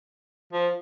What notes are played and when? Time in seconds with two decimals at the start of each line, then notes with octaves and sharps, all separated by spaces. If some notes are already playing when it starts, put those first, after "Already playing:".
0.53 F3